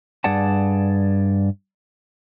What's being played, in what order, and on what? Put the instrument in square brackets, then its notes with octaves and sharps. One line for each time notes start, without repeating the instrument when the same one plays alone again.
[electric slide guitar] G2 G#4 D5 F#5 A5